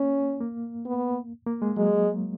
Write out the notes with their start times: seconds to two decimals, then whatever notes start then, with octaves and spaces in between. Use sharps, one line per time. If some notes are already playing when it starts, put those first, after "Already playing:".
Already playing: A#3 C#4
0.41 A#3
0.86 B3
1.46 A#3
1.62 G#3
1.77 F#3 G#3